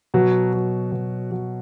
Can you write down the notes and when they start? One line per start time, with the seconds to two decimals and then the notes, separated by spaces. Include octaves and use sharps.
0.14 B2 F#3
0.53 F#3
0.92 B2
1.31 F#3